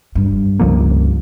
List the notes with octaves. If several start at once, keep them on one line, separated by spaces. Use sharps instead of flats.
G2
C#2 F3 A#3